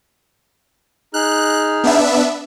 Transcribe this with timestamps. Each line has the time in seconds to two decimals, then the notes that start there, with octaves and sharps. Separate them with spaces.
1.14 D#4 G#4 F6 F#6
1.84 B3 D4 E5